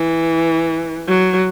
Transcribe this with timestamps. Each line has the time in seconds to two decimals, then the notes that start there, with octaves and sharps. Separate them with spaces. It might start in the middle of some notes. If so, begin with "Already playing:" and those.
Already playing: E3
1.08 F#3